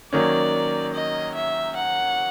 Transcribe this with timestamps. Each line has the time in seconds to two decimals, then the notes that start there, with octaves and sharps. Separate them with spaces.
0.12 D#3 F#3 A#3 C#4 D5
0.94 D#5
1.35 E5
1.76 F#5